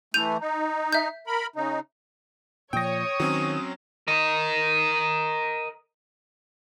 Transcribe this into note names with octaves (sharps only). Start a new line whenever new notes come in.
E3 A3 G6 D#7 F7
D#4
E5 G6
A#4 B5
C#3 D#4
A#2 F3 C#5 G5 D#6 A#6
D#3 F#3 C4 C#4
A#4 D#5